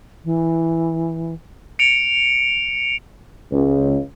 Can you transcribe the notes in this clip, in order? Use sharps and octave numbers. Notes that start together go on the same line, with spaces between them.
E3
C#7 D7 F7
C#2